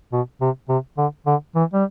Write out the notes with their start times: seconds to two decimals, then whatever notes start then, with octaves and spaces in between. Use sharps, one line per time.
0.12 B2
0.41 C3
0.69 C3
0.98 D3
1.26 D3
1.55 E3
1.73 G3